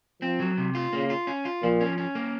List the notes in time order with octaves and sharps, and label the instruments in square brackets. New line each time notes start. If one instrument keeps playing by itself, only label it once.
[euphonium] F3 [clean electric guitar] C4
[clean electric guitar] F#3
C3
F4
[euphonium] C#3 [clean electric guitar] A#3
[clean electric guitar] F4
C#4
F4
[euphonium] A#2 [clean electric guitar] F3
[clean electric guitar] C#4
C#4
A#3